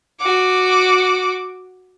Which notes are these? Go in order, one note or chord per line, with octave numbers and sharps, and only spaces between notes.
F#4 D6